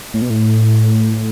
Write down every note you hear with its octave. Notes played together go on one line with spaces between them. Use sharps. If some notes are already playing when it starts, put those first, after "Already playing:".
A2
B2
A2